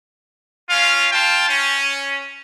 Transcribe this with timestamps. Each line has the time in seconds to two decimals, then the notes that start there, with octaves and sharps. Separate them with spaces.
0.70 C#4 F4 F5
1.12 F4 G5 A5
1.50 C#4